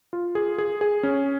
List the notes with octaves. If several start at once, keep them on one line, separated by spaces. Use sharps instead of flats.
F4
G#4
G#4
G#4
C#4